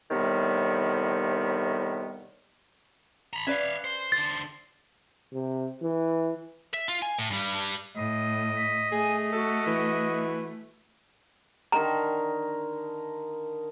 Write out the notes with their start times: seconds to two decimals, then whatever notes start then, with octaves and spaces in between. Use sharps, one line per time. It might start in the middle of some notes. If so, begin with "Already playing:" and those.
0.11 A2 C3 D#3 G3 B3
3.33 A#5 B5
3.47 C#4 B4 D5 E5 F5
3.84 C5
4.12 D3 C5 A6
5.33 C3
5.82 E3
6.74 E5
6.88 F4
7.02 G#5
7.18 A2
7.30 G2 G3
7.97 A2 D#5
8.57 B6
8.92 A3 G#4 G#5
9.32 F#4 A4
9.66 E3
11.72 D3 D#3 A#4 A#5